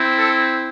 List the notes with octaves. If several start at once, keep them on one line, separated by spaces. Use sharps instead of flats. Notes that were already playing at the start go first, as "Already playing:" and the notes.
Already playing: C4 E4
A4